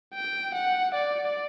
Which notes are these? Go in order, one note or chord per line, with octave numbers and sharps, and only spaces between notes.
G5
F#5
D5